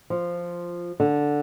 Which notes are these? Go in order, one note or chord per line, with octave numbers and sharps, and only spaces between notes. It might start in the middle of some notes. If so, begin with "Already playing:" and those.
F3
D3